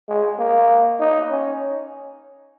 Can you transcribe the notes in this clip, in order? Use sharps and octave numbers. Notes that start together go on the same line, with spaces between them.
G#3
A#3
D#4
C#4